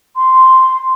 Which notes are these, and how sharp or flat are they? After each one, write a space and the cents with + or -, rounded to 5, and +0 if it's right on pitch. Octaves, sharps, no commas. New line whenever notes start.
C6 -5